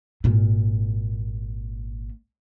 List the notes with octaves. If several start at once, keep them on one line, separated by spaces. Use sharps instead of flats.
G#1 A#2